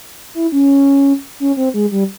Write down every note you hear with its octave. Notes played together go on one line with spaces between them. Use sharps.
E4
C#4
C#4
C4
G#3
G3